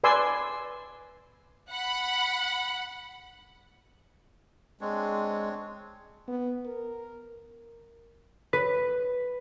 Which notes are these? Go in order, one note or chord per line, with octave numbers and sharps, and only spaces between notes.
B4 D5 G#5 C6 E6
F#5 B5
G#3 C4 D4 C#5
B3
A#4
B4